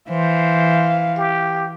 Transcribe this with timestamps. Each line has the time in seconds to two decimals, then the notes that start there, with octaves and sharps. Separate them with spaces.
0.10 E3 C5 F5
1.18 G4